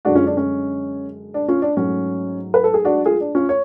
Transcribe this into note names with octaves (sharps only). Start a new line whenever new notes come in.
F#2 D3 G#3 D4 F#4
C#4 F4
D4
C#4
D4
C#4 F4
D4
G#2 F#3 A3 C#4
B4
A4
G#4
D4 F#4
F4 G#4
D4
C#4 F4
C#5